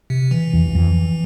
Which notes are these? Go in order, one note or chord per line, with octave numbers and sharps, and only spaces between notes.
C3
E3
E2
E2
F2